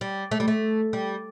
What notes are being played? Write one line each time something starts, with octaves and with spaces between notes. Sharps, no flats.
G3
A3
G3
A3
G3